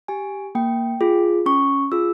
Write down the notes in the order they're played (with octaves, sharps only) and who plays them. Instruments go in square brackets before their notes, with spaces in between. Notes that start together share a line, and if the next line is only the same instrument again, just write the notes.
[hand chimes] G4 G#5
A#3 G5
F4 G#4
C#4 C#6
F4 G#4 E6